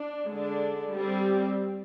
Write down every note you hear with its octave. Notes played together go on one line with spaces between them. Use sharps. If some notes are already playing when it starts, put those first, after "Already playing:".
Already playing: D4
D3 G#3 D4
G3 C4